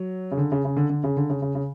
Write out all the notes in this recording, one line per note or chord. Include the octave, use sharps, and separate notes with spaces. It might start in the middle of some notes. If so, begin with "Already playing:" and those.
Already playing: F#3
C#3
D3
C#3
C#3
D3
D3
C#3
D3
C#3
C#3
C#3